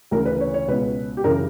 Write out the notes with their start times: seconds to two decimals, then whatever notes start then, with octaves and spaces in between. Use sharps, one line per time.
0.11 D2 C#3 E3 A#4
0.25 B4
0.40 C#5
0.54 C#5
0.68 C#2 B2 B4
1.17 G4
1.24 F#2 C#3 E3 A#4